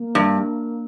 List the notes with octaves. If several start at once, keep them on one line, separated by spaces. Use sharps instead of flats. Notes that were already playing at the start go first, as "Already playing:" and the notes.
Already playing: A#3
G2